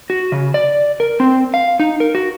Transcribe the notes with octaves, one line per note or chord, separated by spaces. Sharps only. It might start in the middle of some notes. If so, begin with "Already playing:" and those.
F#4
C#3
D5
A#4
C4
F5
D#4
A#4
F#4